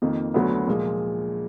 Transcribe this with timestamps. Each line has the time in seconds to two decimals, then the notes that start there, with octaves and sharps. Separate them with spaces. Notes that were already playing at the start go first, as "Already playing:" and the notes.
0.02 F2 D#3 A#3
0.34 D2 D3 F#3 B3
0.68 A#2 F3 G#3